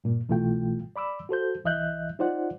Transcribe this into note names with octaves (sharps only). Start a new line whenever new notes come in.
G2 A#2 A#3
C2 B2 E3 A3 F4 G5
D5 B5 D6 E6
F#4 A4 C5 G6
C2 E3 D#5 E5 F#6 G6
D#4 F4 C5 D5 F#5